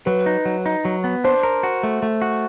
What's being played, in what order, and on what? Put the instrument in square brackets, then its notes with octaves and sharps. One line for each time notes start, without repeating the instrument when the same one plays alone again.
[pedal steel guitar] F#3 [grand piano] B4
[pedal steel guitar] D#4
F#3
D#4
F#3
B3
[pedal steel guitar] D4 [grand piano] C5
[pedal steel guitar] A#4
F#4
A3
A3
F#4